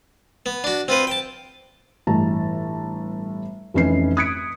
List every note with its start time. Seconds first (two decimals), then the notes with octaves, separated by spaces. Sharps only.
0.46 B3
0.64 D4 F#4
0.88 C4 F4 B4 C5
1.07 G5 A5
2.07 G1 A2 E3 A5 A#5
3.74 F1 E3 C#4 B4 C7
4.17 D#6 F#6 G#6 B6 C#7 D7